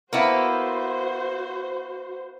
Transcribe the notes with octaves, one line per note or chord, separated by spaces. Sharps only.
A#3 B3 E4 F#4 C5